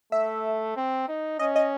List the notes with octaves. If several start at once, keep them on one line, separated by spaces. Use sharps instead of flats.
A3 E5
C4
D#4
C#4 D#5
D#5